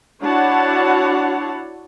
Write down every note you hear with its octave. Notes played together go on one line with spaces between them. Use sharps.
D4 E4 F#4 C#5 F#5 A5